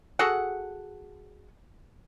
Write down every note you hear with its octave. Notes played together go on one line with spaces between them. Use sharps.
F#4 G#4 A4 F#5